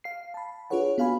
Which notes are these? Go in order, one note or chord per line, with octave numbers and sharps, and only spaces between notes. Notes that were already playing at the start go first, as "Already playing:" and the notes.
F5 C7
A5 B5
D4 F4 G#4 B4 C#5 F#5
B3 F#4 F5 G#5 B5